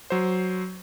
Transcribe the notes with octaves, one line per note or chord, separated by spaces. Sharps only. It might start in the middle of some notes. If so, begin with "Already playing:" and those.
F#3 C5